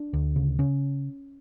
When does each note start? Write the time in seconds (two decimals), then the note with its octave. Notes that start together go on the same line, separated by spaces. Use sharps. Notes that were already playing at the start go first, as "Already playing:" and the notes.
Already playing: D4
0.13 D2
0.36 C#3
0.59 C#3 C#4